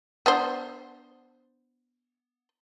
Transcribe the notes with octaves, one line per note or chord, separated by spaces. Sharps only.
B3 D4 C5